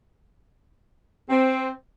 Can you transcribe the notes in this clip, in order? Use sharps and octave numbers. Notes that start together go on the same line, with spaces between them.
C4